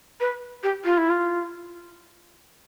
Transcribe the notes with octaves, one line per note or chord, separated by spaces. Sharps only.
B4
G4
F4
E4
F4